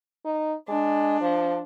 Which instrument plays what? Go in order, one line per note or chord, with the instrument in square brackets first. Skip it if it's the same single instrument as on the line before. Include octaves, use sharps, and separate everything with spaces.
[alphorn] D#4
[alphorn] G#3 [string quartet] D4
[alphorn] F3